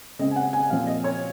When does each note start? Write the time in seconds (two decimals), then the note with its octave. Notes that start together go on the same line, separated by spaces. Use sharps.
0.19 C#3 G#3 C4 D#5
0.31 G#5
0.36 F#5
0.53 G#5
0.70 A#2 F3 C4 F5
0.87 D#5
1.04 C#5